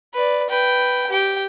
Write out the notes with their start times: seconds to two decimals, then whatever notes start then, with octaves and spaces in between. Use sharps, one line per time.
0.14 B4 D5
0.49 B4 G5
1.10 G4 G5